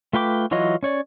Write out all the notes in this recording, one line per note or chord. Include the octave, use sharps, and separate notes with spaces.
A3 F4 B4 G5 D6
E3 F#3 F4 C#5 D#5
C#4 C#5 D5